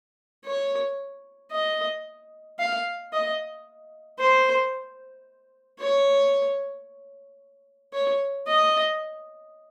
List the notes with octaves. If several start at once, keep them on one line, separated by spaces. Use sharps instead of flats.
C#5
D#5
F5
D#5
C5
C#5
C#5
D#5